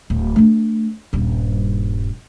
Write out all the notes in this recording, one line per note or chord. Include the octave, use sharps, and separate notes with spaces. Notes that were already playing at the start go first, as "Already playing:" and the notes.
D1
A3 D4
D#1 G2